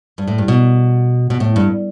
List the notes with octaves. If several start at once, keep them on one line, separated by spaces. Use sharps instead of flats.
G2
A2
G2
B2
B2
A2
G2